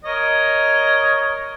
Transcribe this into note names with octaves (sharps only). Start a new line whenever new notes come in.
A#4 C#5 D#5